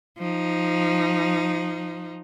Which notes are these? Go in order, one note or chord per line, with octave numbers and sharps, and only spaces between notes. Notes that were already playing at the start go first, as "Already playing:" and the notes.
F3 D#4